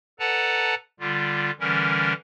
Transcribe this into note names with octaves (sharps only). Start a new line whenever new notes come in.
A4 B4 D5 F#5 A5 A#5
D3 G3 F4
D3 E3 G3 C#4 A#4